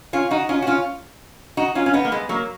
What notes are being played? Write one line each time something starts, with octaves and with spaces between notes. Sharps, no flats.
C#4 F4
D#4 F#4
C#4 F4
F#4
C#4 F4
D#4 F#4
C#4 F4
C#4
B3 D#4
A#3
G#3 B3
F#3 A#3